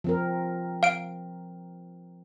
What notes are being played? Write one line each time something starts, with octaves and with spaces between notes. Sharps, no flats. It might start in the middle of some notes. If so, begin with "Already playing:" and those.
F3 C4 A#4
F5 D7